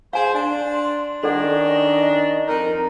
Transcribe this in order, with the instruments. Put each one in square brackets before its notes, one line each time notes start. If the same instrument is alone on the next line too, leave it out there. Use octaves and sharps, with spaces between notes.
[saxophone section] G#4 C5 [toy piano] F5 G#5 [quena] C6
[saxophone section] D4
[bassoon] D#3 [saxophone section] C#4 D4 [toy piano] A4 D5 F#5 [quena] D#5
[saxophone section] F2 D#4 [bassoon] A#4